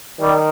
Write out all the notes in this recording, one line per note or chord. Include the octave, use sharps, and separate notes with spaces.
D#3 G3